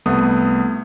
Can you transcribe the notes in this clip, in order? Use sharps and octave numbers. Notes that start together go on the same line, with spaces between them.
C2 A3 B3 D#6